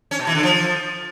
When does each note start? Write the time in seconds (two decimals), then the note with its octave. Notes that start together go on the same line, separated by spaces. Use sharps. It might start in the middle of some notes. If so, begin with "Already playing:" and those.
0.11 C#4
0.19 B2
0.27 E3
0.35 D3
0.43 F3